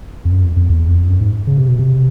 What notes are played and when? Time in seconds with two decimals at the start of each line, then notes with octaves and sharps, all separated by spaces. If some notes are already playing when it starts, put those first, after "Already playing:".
0.25 F2
0.31 F#2
0.44 F2
0.56 F2
0.70 E2
0.88 F2
1.08 F#2
1.21 G#2
1.47 C#3
1.58 C3
1.69 B2
1.79 C3